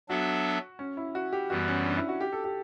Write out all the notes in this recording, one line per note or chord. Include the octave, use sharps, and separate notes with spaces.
F#3 B3 D4 F#4 A4 E5
C#4
E4
F#4
G4
F#2 E3 G3 B3 F#4
C#4
D4
E4
F#4
G4
A4
G4